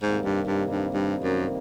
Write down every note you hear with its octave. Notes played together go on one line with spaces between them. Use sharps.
F2 G#2 C3 D#3 G3 A#3
G2
G2
G2
G2
F#2